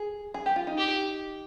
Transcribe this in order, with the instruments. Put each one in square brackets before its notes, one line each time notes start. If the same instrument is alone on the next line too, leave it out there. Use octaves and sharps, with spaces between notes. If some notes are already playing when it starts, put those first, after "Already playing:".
Already playing: [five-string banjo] G#4
G#4
G4
F4
D#4
[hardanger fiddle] G4